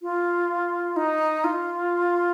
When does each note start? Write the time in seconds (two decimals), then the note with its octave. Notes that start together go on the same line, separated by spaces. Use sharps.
0.02 F4
0.96 D#4
1.44 F4